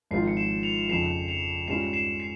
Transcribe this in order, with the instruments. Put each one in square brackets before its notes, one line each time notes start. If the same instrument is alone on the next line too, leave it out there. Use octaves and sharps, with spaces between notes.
[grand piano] G#1 G#2 F3 C4 F4 [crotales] C7
[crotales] C#7
C7 E7
C#7 F7
[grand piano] F2 C#3 F3 [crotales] C7 E7
[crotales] C#7 F7
[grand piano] G#2 G3 C#4 F4 [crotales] C7 E7
[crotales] C7 E7
C7